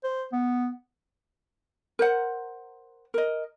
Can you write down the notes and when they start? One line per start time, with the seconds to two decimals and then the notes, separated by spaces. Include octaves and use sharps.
0.04 C5
0.32 B3
1.99 A#4 C5 F#5
3.14 A#4 D#5